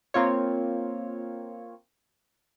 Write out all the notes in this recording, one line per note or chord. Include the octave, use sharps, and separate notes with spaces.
A#3 C4 F4 C#5